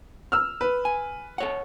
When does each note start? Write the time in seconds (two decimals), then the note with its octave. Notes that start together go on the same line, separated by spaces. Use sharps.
0.32 E6 F6
0.61 B4
0.85 G#5
1.38 A4 C#5 F#5